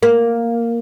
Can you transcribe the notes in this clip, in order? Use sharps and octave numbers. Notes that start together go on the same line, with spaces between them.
A#3